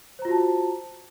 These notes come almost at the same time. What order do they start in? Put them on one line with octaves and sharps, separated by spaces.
C5 A#5 F4 F#4 A5